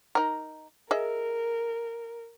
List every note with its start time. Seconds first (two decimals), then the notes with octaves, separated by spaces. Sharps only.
0.15 D#4 A#4
0.91 G#4 A#4 D#5 E5